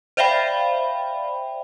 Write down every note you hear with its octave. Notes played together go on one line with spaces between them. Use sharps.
C5 D5 E5 F5 G5 B5